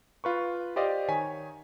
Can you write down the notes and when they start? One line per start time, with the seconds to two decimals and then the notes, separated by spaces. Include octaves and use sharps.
0.24 F4 B4 C#6
0.76 G4 C5 D5 D#5 F5
1.08 D#3 C#5 G#5 B6